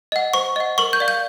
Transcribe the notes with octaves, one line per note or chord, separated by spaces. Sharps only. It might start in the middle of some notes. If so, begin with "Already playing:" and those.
D#5 F#5
C5 C#6
D#5 F#5
A#4 C#6
G6
D5 F5
G6